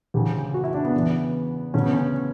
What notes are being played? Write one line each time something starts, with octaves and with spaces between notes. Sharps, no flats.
D2 C#3 E3 G4
F#4
E4
D4
B3
E2 C#3 E3
D2 C#3 E3 C#4
B3
C#4